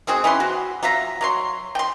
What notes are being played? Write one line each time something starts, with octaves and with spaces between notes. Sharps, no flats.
G#3 C4 F#4 G#4
E3 C#4 F#5 C6
F#4
F#3 F4 E5 A#5
F#3 C#5 C6
G5 C6